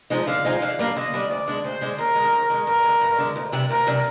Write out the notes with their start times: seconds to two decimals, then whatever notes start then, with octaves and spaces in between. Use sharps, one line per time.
0.10 F3 G#3 D#4
0.27 D3 F5
0.45 F3 G#3 D#4
0.62 D3
0.79 G3 A#3 D4
0.96 D3 D#5
1.13 G3 A#3 D4
1.29 D2 D5
1.47 D3 G#3 D4
1.64 D2 C5
1.81 D3 G#3 D4
1.98 D#2 A#4
2.15 D#3 G#3
2.33 D#2
2.50 D#3 G#3
2.67 G2 A#4
2.84 D3 G#3
3.01 G2
3.18 D3 G#3
3.36 D2
3.52 C3 G3 D4
3.69 D2 A#4
3.87 C3 G3 D4